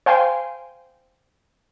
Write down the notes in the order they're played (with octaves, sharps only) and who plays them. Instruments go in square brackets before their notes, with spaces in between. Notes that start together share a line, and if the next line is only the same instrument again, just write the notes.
[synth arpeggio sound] C5 F5 G5 G#5 C6